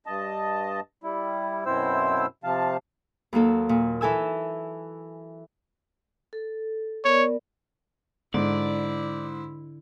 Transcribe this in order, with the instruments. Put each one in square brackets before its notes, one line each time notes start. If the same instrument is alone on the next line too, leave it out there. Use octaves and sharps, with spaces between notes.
[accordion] G2 D#5 A5
G3 E4
F#2 B2 C4 E4 C5 E6
C3 F3 F5 A5
[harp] D#2 F#3 A#3 A4
A#2
E3 A4 G#5 E6
[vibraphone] A4
[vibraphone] B3 A#4 D5 [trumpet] C#5
[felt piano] G#2 [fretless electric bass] D3 [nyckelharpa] E4 [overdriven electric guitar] D5